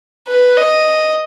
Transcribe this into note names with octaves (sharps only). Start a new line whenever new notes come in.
B4
D#5